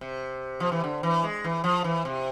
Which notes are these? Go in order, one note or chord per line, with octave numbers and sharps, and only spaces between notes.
C3
F3
E3
D3
E3
G#3
E3
F3
E3
C3